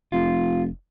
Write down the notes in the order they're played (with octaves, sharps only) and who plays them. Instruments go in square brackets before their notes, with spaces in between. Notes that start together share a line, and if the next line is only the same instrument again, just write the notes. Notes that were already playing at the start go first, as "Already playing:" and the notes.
[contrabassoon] F1 [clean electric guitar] F4